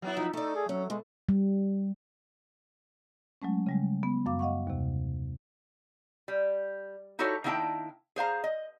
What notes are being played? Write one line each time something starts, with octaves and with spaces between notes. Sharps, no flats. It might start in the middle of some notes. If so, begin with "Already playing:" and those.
F#3 B3 E4
F3 D#4
A3 D#4 A4 D5
G#4
F#3 C#4
B2 G#3
G3
F#3 G#3 A3 C#4
C#3 G3 G#3
B3
F#2 F5 D6
D#5 F5 F#5 C#6
D#2 C3
G3
D#4 E4 F#4 G4 A4 C#5
D#3 A#3 D4 E4 G5 A5
G#4 C5 F5 A#5
D#5